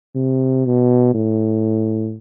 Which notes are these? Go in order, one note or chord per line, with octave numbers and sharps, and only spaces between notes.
C3
B2
A2